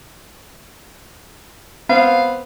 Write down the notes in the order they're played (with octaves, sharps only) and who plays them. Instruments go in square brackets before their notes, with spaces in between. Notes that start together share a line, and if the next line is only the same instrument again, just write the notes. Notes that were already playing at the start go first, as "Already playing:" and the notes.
[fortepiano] B3 C4 [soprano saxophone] F5